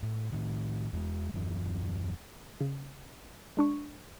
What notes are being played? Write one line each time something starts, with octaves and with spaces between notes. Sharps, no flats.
A2
A2 D#3
E2 G3 G#3
D#1 F#2 E3
C#3
G#3 D4 C#6